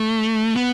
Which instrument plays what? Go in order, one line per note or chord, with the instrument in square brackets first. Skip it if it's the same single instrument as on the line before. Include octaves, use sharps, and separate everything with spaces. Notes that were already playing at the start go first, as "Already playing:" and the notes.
Already playing: [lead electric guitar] A3
B3